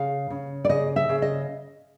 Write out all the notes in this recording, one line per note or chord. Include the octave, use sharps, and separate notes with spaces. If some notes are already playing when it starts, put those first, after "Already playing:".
Already playing: C#3 F5
C#3
D5
C#3 D#5
E5
C#3
D#5